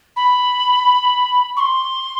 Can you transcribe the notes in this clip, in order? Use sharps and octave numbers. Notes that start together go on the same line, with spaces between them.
B5
C#6
C6